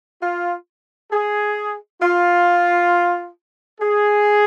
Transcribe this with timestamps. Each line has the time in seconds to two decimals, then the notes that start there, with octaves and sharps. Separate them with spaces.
0.21 F4
1.11 G#4
2.01 F4
3.80 G#4